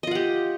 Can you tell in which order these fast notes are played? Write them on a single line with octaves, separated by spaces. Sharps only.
D#5 F4 F#5 G4